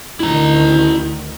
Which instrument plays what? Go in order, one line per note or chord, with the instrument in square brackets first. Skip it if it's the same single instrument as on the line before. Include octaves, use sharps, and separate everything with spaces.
[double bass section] D2 D3 D#3 [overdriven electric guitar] E4 A#5